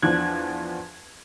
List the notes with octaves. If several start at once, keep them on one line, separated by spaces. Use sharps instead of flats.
E2 F3 D4 F#6 G#6